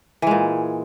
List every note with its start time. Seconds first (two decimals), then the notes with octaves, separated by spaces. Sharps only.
0.22 E3
0.27 G#3
0.31 A#2